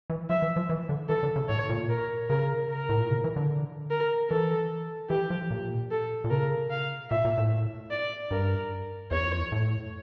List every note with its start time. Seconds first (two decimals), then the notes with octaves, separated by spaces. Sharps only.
0.10 E3
0.30 F3 E5
0.42 E3
0.56 F3
0.69 E3
0.89 D3
1.09 E3 A4
1.23 D3
1.36 C#3
1.49 A2 C#5
1.69 A#2
1.90 A#4
2.30 C#3 A#4
2.70 A#4
2.89 A2
3.00 A#2
3.10 C#3
3.24 E3
3.36 D3
3.91 A#4
4.30 E3 A4
5.10 E3 G4
5.30 F3
5.51 A#2
5.91 A4
6.24 A#2
6.31 C#3 A#4
6.71 F5
7.11 A#2 E5
7.25 A#2
7.38 A2
7.91 D5
8.31 G2 A#4
9.11 E2 C#5
9.25 F2
9.38 E2
9.52 A2